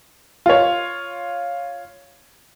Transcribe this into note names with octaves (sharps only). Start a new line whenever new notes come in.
F4 C#5